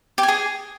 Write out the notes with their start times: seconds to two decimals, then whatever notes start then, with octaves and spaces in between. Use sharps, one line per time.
0.18 G4
0.23 G#5
0.28 G#4